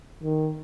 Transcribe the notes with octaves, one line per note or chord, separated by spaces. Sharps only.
D#3